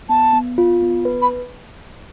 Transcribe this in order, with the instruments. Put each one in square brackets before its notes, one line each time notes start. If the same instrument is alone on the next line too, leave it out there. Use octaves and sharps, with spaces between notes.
[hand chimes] B3 [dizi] A5
[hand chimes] B3
F4
B3
B4
[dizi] B5